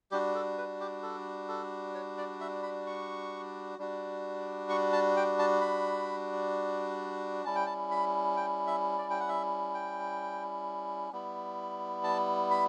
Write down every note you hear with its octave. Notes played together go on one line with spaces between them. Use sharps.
G3 D4 F#4 G4
A4
B4
G4
A4
A4
C#5
D5
E5
B5
C#6
G3 D4 F#4
C#6
A5
G5
A5
B5
G3 C#4 E4 A5
G5
A5
B5
G5
E5
D5
G5
F#5
E5
G5
G3 B3 E4
A5
B5